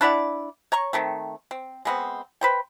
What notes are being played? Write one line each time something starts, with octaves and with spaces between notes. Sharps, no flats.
D4 E4 D5 F#5
C#5 A#5 C#6
D#3 A3 C4
C4
G#3 B3 C4
B4 C5 G5